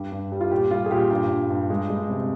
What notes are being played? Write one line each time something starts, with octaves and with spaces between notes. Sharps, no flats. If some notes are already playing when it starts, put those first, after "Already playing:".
Already playing: G2 G3 G4
G2
G3
F4
A#2 G4
G3 F4
G#4
A#2 G4
G2 G4
G2
G2
G#3
G#3
C3